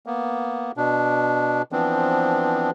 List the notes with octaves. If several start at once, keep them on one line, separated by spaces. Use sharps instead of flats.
A#3 B3
B2 D4
E3 F3 B3 C4 D4